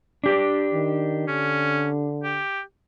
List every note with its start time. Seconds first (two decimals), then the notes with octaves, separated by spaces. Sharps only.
0.24 D4 G4
0.73 D#3
1.28 D3 C#4
2.23 G4